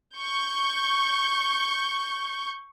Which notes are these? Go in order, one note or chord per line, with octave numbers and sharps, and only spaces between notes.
C#6 G6